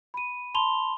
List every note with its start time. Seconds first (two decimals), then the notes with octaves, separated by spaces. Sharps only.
0.14 B5 D#7
0.54 A5 B5 C6 F7 G7